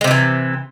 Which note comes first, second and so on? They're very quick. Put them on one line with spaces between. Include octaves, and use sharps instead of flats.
G#3 C3 F3 E3